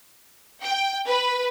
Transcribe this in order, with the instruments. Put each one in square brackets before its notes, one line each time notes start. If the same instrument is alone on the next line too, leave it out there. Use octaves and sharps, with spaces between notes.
[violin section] G5
B4